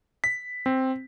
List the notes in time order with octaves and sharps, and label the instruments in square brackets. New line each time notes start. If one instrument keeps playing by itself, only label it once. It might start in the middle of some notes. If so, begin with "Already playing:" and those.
[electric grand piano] B6
C4